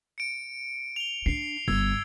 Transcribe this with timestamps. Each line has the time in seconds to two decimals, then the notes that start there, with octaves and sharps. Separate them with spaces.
0.18 C#7 D7
0.96 F7 G7
1.26 D4 C7
1.68 G1 E6 G#6